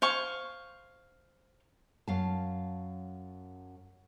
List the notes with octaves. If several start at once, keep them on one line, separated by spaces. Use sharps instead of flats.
C5 F5 G#5 C#6
F#2 F5 A5